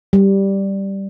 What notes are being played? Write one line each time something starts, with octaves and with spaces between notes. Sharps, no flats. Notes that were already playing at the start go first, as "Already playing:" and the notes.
G3